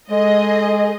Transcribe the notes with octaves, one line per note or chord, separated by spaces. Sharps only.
G#3 G#4 A4 D#5